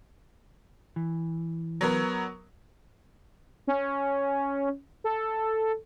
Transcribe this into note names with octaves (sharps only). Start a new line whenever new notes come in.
E3
F#3 B3 A#4
C#4
A4